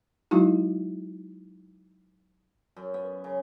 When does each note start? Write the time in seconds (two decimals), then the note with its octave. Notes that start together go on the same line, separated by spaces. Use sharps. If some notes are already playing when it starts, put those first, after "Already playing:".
0.31 F#3 G#3 D#4 E4 F#4
2.76 F#2
2.94 B3
3.24 C#3